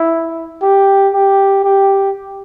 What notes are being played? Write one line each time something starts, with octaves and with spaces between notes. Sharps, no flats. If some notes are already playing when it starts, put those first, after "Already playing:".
Already playing: E4
G4
G4
G4